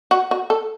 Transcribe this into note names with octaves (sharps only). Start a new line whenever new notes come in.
F#4
F#4
A4